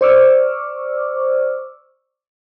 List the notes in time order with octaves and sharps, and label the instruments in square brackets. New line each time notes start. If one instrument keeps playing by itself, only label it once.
[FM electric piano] C5 D5 C#6 D6 E6 F6